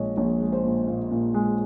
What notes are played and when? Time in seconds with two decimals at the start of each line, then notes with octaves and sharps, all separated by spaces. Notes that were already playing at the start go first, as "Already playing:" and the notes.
Already playing: A#1 A#2 G#3 C#5 D#5
0.17 A#1 C#5
0.41 G#3
0.53 C5
0.64 A#2
0.87 A#2
1.11 A#2
1.34 G#3